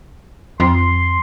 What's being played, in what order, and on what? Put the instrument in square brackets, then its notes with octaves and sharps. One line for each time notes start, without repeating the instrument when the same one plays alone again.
[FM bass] F2 [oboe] C6